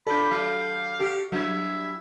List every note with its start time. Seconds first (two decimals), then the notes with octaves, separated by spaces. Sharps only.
0.07 D4 F4 A4 D5 B5 G6
0.31 F#3 F5
0.99 F#4 G4 A4
1.32 F#3 G3 D4 E4 E5 G#6